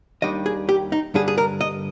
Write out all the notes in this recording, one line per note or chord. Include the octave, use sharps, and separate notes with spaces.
D#2 D#3 G3 D4 D#5
G#4
G4
D#4
G2 D3 G3 D4 G#4
G#4
A#4
D#5